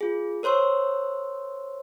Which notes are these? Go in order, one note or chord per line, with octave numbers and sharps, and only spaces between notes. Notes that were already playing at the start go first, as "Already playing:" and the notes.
F4 G#4
A#4 C5 C#5 C6 E6